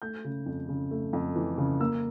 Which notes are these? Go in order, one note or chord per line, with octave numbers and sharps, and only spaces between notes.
A3 G6
C#3
F2
C#3
A3
F2
E3
C#3
A#3 E6